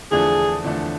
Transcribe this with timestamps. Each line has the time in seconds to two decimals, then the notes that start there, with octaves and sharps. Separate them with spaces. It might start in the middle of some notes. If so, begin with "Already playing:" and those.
0.11 E2 D3 F3 A3 D4 G#4
0.64 E2 D3 F3 A3 D4